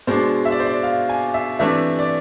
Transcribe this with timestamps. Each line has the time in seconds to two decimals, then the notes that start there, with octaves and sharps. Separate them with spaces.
0.07 B2 G#3 D4 C5
0.45 E5
0.52 D5
0.60 C5
0.67 D5
0.83 F5
1.09 G#5
1.34 E5
1.59 C3 E3 A3 D4 E5
1.99 D5